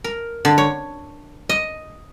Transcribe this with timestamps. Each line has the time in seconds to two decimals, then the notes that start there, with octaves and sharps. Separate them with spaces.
0.04 A#4
0.45 D3
0.58 C#5
1.49 D#5